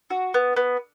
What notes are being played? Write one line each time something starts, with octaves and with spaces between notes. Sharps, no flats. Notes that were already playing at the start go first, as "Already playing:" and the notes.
F#4
B3
B3